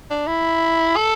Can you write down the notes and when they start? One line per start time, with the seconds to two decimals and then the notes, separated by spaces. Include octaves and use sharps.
0.10 D4
0.27 E4
0.96 A4